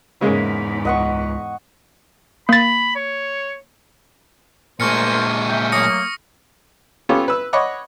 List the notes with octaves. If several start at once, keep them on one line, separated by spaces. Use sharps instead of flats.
E2 G#2 C#3 G#3 A#3
C#2 D#5 F#5 C#6
A#3 B5 A6
C#5
A#2 G#3 A3 A#4 C5 C#6 F6 C#7
E5 G5
F#3 A3 A#3 D#6 A#6 C#7
B3 C#4 F4 G4 A4
B4 E6
C#5 D#5 F#5 B5 C#6 D6